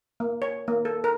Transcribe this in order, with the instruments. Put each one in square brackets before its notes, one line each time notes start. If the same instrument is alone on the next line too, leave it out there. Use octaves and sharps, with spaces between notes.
[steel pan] A#3
C#5
A#3
A4
A#4